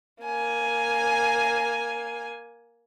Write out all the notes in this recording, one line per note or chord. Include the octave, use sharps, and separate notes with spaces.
A#3 G#5